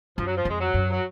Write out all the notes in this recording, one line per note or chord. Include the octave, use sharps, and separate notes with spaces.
F#2 F3
F#3
F3
F2 G#3
F#3
F#2
F#3